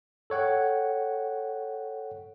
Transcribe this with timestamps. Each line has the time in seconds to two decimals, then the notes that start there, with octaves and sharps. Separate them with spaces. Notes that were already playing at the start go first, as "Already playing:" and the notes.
0.30 A4 C#5 F#5 G5